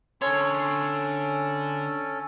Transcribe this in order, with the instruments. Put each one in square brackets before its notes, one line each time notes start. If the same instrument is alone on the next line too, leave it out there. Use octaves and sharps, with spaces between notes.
[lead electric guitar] D3 C6 [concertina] C#4 A4 [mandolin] C#5